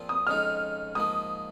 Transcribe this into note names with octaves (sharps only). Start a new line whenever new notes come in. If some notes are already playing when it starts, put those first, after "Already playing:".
Already playing: A#2 F3 C4 F4 G#4
D#6
F2 C#3 G#3 D#4 F6
G#2 F3 A#3 D#6